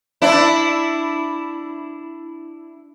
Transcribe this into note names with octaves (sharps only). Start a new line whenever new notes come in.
D4 E4